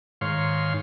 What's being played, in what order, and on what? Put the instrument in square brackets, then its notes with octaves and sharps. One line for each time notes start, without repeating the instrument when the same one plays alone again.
[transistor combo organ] G#2 D#3 C#5 F5 C6